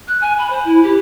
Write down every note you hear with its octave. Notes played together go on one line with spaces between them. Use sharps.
F#6
G#5
B5
C5
E4
G4